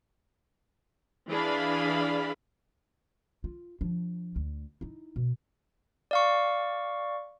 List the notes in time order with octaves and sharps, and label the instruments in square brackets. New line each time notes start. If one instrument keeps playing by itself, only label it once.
[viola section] E3 D4 G#4 D5 F5 B5
[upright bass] F4
F3 D4
D2
D#4 E4
B2
[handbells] D5 F5 C#6